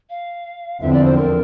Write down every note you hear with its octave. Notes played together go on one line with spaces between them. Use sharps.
F5
E2 D3 F3 C4 E5
D5
C5
A#4